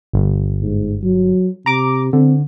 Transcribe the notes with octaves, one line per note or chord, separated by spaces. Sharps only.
G1
G#2
F#3
C3 A#5 D6
D3 C4